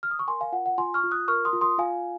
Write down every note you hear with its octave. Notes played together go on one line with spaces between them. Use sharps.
F6
D#6
C#6
A#4 G#5 C6
F5 G#5
F4 F#5
F#5
F4 G#5 C6
C#6 F6
F4
D#6 F#6
A#4 C#6 F6
C6 D#6
F4
C6 D#6
F4 F5 G#5